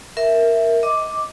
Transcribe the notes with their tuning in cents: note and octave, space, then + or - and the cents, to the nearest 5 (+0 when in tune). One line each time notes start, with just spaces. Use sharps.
A#4 +0 E5 +0
D#5 +25 D6 +0